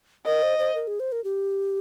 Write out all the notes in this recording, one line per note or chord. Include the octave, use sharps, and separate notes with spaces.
A#4 D#5
C5
C5
A#4
G#4
C5
A#4
G4